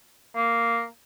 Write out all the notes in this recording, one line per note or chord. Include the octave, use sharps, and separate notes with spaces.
A#3